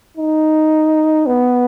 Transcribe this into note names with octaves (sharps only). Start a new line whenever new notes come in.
D#4
B3